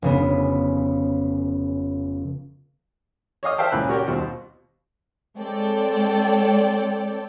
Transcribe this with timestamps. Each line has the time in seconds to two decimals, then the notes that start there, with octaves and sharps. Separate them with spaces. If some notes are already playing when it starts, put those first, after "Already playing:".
0.02 F1 C#3 B3
3.43 C#5 D#5 F5 D#6
3.58 C5 E5 F5 G5 A5
3.72 C#2 A#2 E3 C#4 B5 F#6
3.89 F#4 G4 A#4 C#5 D5 G5
4.06 D#2 B2 G3 C4 F4 F#4
5.38 G#3 C4 A4 C#5 D5 G5